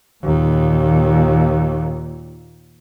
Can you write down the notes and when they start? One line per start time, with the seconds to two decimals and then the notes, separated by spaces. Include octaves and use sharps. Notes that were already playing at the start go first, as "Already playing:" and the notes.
0.24 D#2 A#2